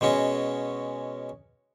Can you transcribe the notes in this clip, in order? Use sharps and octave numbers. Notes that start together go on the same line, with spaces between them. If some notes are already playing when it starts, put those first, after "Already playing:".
B2 G#3 C#4 F#4